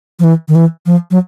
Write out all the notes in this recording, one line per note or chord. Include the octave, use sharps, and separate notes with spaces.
F3
E3
D#3
E3
F3
F#3